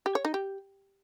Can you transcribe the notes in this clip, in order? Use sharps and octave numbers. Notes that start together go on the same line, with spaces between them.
G4
C#5
D#4
G4